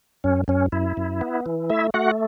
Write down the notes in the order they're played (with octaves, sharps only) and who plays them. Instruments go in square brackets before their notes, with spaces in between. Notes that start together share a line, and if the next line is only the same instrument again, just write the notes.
[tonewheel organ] F#2 C#4
F#2 C#4
F#2 E4
F#2
B3
E3
A3 E4 E5
A3 F#4 F#5